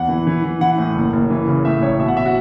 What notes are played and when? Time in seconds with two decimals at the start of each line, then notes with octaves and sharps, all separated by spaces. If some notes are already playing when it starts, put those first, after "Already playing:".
Already playing: E2 F#5
0.09 E3
0.27 E3
0.44 E3
0.61 E3 F#5
0.78 A2
0.96 F#1
1.13 F#1
1.30 E3
1.48 C#3
1.65 A2 E5
1.82 A1 C#5
2.00 B2 E5
2.08 F#5
2.17 E5
2.26 F#4